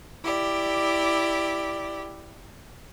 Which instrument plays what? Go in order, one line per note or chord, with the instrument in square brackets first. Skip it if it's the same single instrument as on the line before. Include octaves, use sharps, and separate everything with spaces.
[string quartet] E4 G4 D5